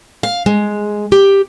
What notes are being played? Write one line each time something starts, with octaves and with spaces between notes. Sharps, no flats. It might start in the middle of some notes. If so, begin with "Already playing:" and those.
F5
G#3
G4